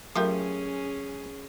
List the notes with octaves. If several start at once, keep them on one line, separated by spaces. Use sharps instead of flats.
F#3 A3 C#4 F4 G4 G#4 A#4